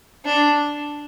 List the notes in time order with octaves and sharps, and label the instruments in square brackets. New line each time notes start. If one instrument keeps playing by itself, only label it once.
[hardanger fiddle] D4